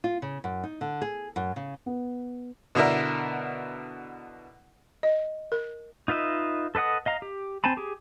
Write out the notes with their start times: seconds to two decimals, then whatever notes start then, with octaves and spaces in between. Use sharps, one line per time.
0.04 F4
0.22 C#3
0.44 F#2
0.63 D#4
0.81 D3
1.02 G#4
1.36 F#2
1.56 C#3
1.86 B3
2.75 B2 D3 D4 E4 A#4
5.03 D#5
5.52 A#4
6.08 D#4 F4 B4 D#5 E5
6.75 A4 B4 D#5 F#5 D#6
7.06 D#5 F5 A#5
7.22 G4
7.64 C4 C5 G#5 A5 B5
7.77 G4 G#4